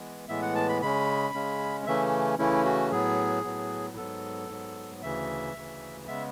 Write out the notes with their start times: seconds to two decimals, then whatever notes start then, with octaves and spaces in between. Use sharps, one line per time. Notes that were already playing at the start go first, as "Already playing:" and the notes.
Already playing: E3 G#3 B3
0.29 A2 E3 G#3 B3 E5
0.42 F#5
0.55 A5
0.69 B5
0.82 C#3 G#3 C#4 B5
1.34 C#3 G#3 C#4
1.86 C#3 E3 A3 C#4 E5
2.39 C#3 E3 A3 C#4 E4
2.65 F#4
2.92 A2 F#3 B3 G#4
3.44 A2 F#3 B3
3.97 G#2 F#3 B3 A4
4.49 G#2 F#3 B3
5.02 D2 C#3 E3 E5
5.54 D2 C#3 E3
6.07 C#3 G#3 B3 E5